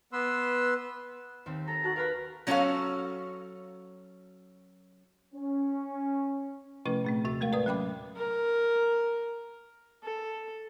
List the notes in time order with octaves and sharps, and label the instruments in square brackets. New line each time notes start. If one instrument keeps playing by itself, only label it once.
[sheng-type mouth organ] B3 B4 C6 E6
[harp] D#2 C4
[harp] A4 [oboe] A#5
[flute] F#4 [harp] A5 F#6
[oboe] A#4 [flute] B4 [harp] F5 A#5 B5
[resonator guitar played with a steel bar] F#3 C#4 F#4 G4 A4 F5
[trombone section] C#4
[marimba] C3 F3 A3 C#4 E4 B4
A#2 A3 C4
D#2 C3 F#4 A6
G#3 A3 A#4 F5
A2 B4 D5 D#6
F#3 C#4 G5 B5 D6
[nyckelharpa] A#4
A4